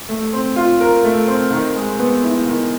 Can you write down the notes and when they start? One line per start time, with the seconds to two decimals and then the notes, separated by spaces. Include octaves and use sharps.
0.09 A3
0.33 C4
0.56 F4
0.81 A#4
1.04 A3
1.28 C4
1.51 D#3
1.75 G#3
1.98 B3
2.23 E4
2.46 D#3